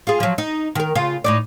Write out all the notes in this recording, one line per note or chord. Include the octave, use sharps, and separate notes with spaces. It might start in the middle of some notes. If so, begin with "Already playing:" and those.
F4 G#4
F3 F#3
D#4
D#3 A#4
C#3 F4
A2 D#4 D5